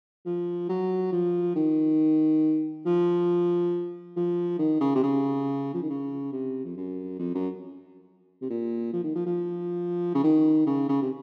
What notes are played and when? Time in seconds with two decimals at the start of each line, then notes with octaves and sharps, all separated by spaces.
0.26 F3
0.69 F#3
1.12 F3
1.55 D#3
2.86 F3
4.16 F3
4.59 D#3
4.81 C#3
4.95 C3
5.03 C#3
5.74 F3
5.82 D#3
5.90 C#3
6.32 C3
6.65 F2
6.77 F#2
7.19 F2
7.35 F#2
8.41 C3
8.50 A#2
8.93 F3
9.04 D#3
9.15 F3
9.26 F3
10.15 C#3
10.23 D#3
10.66 C#3
10.89 C#3
11.02 C3